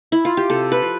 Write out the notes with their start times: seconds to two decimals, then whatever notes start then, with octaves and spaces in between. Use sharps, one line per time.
0.12 E4
0.25 F4
0.37 G4
0.50 C3 A4
0.72 B4
0.82 F3